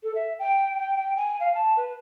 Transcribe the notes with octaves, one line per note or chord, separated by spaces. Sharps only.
A4
E5
G5
G5
G5
G#5
F5
A5
B4